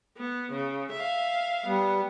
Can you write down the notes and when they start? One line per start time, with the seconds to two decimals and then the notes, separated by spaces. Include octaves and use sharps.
0.16 B3
0.51 C#3
0.92 E5 F5
1.66 G3 B3